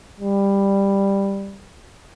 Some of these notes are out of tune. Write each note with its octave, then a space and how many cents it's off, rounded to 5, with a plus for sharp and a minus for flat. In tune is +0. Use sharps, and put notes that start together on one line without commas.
G3 +10